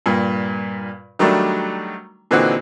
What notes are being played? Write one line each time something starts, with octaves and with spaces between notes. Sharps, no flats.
G2 A#2
D#3 F#3 G3 A3 D4
A#2 D3 E3 C4 D#4 F#4